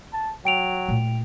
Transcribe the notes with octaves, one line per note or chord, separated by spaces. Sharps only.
A5
F#3 G5 D7 F7
A#2 A3